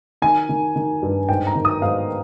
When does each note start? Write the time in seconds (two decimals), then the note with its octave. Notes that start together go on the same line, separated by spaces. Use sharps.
0.22 D#3 G#5
0.49 D#3
0.76 D#3
1.03 G2
1.29 G#2 G5
1.47 A#5
1.55 D#3
1.65 D#6
1.82 G#2 F5